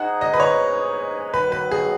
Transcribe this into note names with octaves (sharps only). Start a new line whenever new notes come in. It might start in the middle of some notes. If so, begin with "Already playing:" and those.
Already playing: G#2 G#3 D#4 F#5
D#5
B4
C#5
D#2 D#3 F#3 D#4 B4
B4
G#4